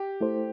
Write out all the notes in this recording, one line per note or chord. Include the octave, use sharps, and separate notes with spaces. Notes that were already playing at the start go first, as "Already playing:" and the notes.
Already playing: G4
A3 E4 A4 C5